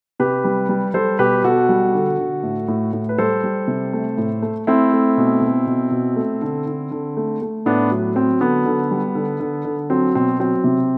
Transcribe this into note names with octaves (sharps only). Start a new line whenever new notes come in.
C3 G4 B4
G3
G3
G3 A4 C5
B2 G4 B4
B2 F#4 A4
G3
D3
D3
A2
A2
A2
B4
G3 A4 C5
G3
C3
A3
A2
A3
A3 C4 E4
A3
B2
B2
B2
B2
A3
D3
D3
D3
A3
A3
A2 B3 D4
F#3
F#3 C4
D3 B3
D3
G3
D3
D3
D3
F#3 C4
B2 C4
F#3 C4
C3